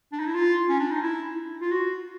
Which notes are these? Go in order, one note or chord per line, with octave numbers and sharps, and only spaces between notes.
D4
D#4
E4
F4
C#4
D4
D#4
E4
F4
F#4